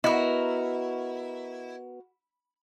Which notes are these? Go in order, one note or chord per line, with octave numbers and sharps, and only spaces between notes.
B3 E4 F#4 A#4 D#5